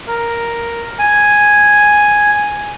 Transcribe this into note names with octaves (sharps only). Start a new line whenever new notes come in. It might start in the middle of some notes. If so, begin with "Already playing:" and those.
A#4
G#5